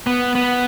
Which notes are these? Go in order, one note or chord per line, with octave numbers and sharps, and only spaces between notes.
B3
B3